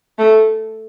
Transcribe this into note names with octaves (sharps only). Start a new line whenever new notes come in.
A3